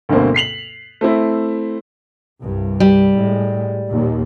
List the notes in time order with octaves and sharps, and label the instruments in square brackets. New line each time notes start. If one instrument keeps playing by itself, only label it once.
[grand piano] D2 G2 B2 A#3 C4
B6 C7 F7 F#7
A3 C4 E4
[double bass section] C2 G2
[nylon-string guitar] G3
[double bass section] A2 G#3
D#2 A#2